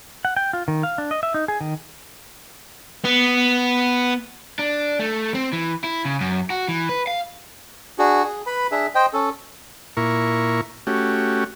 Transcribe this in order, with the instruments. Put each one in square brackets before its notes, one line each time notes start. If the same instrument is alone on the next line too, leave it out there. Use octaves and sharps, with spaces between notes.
[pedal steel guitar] F#5
G5
F4
D#3
F5
D4
D#5
E5
D#4
G#4
D#3
[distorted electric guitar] B3
[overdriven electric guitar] D4
A3
C4
E3
E4
C#3
F#2
F#4
E3
B4
F5
[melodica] D4 F#4 G#4
G#4
B4 B5
D4 G#4 E5
C5 D#5 G5
C#4 A4
[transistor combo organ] A#2 E4 A#4 C#6
A3 C#4 F#4 G4